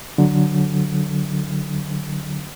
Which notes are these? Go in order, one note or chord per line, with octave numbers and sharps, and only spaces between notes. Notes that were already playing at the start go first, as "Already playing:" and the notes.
D3 F#3